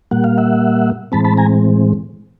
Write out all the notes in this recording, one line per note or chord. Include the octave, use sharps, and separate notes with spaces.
A#2 G3 A#3 F#5
F5
E5 F#5
A2 E3 G#3 C4 A5 B5
A5 B5
G#5 A#5